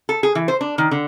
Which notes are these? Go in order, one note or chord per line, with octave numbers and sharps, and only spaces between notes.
A4
G#4
E3
C5
D4
D#3
D3